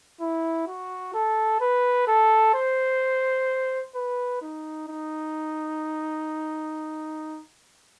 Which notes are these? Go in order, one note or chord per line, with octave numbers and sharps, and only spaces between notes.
E4
F#4
A4
B4
A4
C5
B4
D#4
D#4